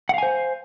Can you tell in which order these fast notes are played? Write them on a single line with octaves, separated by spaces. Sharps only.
F#5 F5 G#5 C5